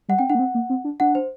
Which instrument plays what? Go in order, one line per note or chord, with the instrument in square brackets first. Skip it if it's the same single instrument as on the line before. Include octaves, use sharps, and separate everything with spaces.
[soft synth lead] G3 [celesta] F#5
[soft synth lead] C4 [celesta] G5
[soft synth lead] D4 [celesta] F#5
[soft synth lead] A#3
C4
A#3
C4
D4
[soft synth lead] D4 [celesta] F#5
[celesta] C5